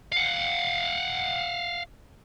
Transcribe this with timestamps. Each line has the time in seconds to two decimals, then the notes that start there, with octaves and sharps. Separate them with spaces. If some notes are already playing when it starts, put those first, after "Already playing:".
0.12 F5 F#5